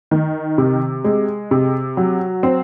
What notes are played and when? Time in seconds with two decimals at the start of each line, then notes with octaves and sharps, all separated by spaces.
0.11 D#3
0.58 C3
1.04 G#3
1.51 C3
1.97 F#3
2.43 C4